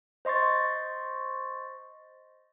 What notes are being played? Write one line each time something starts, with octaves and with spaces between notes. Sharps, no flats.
C5 D#5 C6 C#6 A6